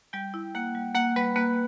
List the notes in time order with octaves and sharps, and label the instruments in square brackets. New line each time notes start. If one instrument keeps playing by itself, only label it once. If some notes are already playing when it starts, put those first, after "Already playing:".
[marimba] G3 [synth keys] G5
[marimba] E4
[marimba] A#3 [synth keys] F#5
[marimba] G3
[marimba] A#3 [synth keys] F#5
[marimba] G3 [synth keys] B4
[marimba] A#3 [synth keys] B4